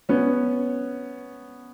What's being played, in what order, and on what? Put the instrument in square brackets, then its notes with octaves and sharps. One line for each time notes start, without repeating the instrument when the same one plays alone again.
[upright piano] B3 C#4